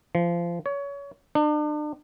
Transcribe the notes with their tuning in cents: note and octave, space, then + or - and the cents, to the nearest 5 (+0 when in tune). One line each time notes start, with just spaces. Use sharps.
F3 -25
C#5 +25
D4 +40